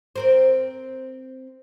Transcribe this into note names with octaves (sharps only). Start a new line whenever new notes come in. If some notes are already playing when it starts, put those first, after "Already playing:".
C4 A#4 C5